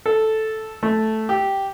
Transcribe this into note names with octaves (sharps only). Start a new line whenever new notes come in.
A4
A3
G4